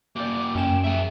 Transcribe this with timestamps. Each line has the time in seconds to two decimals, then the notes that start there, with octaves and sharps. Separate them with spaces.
0.16 A#3 F#4 D5 G5 D6
0.55 F#2 C#4 G5 E7
0.84 G#4 E5